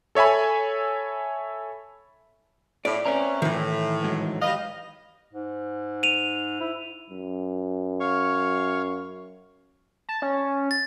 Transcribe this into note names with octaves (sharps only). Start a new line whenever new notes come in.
A4 C#5 E5 G#5 B5
A2 D5
C4 C#4 B4 E5 A#5
A2 D#3 E3
G#2 F#3
G3 B4 D#5 F5
G#2
D#7 F7
E4
F#2
C#5 F5 C#6
A5
C#4
A6